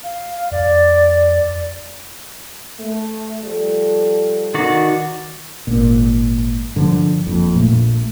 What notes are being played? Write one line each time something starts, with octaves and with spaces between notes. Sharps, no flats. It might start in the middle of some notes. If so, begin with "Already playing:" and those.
F5
F2 D5
A3
F3 G3 A4
D#3 F#4 D5
G#1 A#2
G2 D3 F3
F#1 F2
A#1 A#2 A3